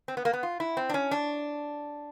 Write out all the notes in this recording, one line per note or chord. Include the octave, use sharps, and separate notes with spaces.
C4
B3
A#3
B3
F4
E4
C4
D4
C#4
D4